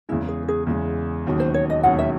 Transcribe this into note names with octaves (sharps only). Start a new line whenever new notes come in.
E2 C#3 G#3 E4
G#4
G#4
E2 C#3 G#3
E1 D#2 D#3 F#3 C#4
C5
C#5
D#5
E1 D#2 D#3 F#3 C#4 F#5
E5